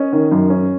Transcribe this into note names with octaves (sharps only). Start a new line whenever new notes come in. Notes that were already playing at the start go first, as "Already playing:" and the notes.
Already playing: C#4 D#5
D#3
F#2
C#4